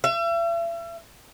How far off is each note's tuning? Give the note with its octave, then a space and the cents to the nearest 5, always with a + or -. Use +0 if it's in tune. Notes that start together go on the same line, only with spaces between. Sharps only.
E5 +40